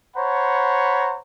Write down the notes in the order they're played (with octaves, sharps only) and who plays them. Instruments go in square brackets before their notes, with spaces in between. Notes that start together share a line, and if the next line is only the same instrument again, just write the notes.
[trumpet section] C5 C#5 F#5 A#5 B5